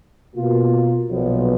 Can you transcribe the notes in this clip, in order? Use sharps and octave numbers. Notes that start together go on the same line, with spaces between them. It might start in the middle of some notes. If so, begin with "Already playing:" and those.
B2 A#3 F4
B1 A#2 F3 B3